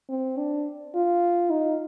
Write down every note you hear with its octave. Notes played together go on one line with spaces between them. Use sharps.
C4
D4
F4
D#4